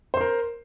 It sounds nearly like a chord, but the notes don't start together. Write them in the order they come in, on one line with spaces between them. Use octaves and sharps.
C5 C6 A#4